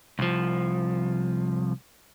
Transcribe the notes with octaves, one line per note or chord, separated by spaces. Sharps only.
C2 F3